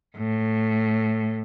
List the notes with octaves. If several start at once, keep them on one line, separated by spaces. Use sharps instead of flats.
A2